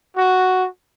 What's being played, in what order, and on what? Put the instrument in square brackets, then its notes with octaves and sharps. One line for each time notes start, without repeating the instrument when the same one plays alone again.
[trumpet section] F#4